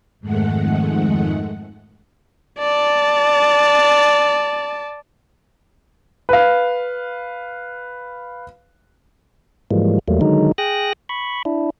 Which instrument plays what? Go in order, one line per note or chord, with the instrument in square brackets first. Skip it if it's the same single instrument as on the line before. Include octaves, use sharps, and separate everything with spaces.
[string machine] F2 G#2 D#3 G#3 A3 F#5
[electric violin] D5 A5
[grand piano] B4 F5
[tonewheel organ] G#2 E3 F3 G3 G#3 A#3
E2 F#3 G3 A3 A#3
D3 D#3 F#3 G#3 D#4
G#4 G5 D#6 F#6 A#6
B5 C#6
D4 E4